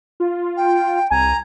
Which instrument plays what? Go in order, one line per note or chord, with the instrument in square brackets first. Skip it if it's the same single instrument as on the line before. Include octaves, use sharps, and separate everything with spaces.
[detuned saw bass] F4
[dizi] G5
[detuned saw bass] C2 [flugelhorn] G#5 [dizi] A#5